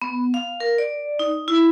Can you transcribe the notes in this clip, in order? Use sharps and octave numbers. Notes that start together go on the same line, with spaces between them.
B3
F5
A#4
D5
D#4
E4